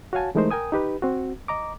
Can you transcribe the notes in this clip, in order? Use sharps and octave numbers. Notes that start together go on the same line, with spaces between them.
F#4 C#5 F5 G#5 A5
E3 G#3 A3 D#4 A#4 C5
A#4 G5 G#5 D#6
D#4 G4 B4
C4 F#4
D#5 A#5 D6